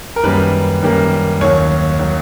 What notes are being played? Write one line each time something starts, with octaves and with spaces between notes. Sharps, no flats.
A#4
F#2 D#3 G3 A#3 B4
F#2 D#3 G3 A#3
D#2 D#3 F#3 C#5
D#3 F#3